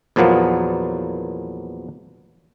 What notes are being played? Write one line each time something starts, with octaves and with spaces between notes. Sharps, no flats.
E2 A#2 F3 F#3 A#3 B3